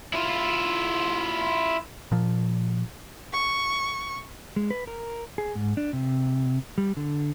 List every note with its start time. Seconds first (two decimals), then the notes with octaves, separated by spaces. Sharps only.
0.13 E4 F4
2.12 A#2 F3
3.33 C#6
4.56 G#3
4.71 B4
4.87 A#4
5.38 G#4
5.55 G#2
5.77 D4
5.93 C3
6.78 G3
6.97 D3